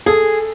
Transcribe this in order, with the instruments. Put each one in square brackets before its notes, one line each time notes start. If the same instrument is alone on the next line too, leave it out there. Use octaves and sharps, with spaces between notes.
[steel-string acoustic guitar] G#4 [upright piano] A4